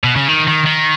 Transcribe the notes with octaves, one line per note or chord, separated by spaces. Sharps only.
B2
C#3
D#3
D#3
D#3